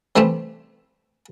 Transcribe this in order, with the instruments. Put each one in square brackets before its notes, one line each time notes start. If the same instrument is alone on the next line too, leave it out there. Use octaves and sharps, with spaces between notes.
[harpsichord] C3 E3 G3 A3 C4